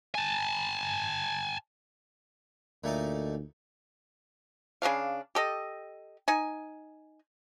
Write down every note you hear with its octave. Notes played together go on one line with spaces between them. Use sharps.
G#5 A5
D2 A#2 A3 D#4
C#3 B3 D4 F5
G4 A4 D#5
D#4 G#5